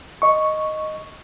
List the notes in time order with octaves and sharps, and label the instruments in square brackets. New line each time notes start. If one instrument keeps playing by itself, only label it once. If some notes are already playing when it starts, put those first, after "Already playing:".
[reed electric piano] D#5 C#6